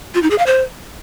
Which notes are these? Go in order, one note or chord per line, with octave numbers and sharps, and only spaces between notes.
F4
D#4
G#4
F5
C5